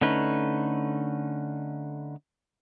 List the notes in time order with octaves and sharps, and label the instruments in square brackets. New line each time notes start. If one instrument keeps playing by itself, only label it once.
[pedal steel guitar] D3 A3 C#4 D#4 B4